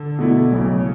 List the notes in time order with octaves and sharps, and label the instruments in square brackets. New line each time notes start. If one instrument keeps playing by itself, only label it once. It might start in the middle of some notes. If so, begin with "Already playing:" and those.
Already playing: [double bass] D3
[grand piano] B2 A3 E4
[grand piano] B1 [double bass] C#3